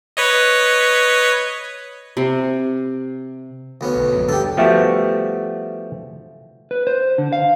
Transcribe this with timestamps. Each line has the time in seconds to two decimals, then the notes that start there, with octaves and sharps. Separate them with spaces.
0.17 B4 C#5 D#5
2.17 C3
3.81 D2 B3 C#4
3.96 B1
4.12 A#1 F#2
4.29 D2 G2 D3 G4 A4
4.57 F3 G3 A3 B3 F#4 G4
6.71 B4
6.87 C5
7.18 D3
7.33 F5